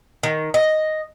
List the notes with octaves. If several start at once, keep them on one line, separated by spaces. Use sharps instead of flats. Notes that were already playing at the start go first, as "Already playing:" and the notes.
D#3
D#5